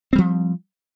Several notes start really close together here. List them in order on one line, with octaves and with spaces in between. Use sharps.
C4 G3 F3